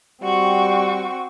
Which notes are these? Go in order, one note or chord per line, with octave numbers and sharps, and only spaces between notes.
G3 C4 F#4 C#6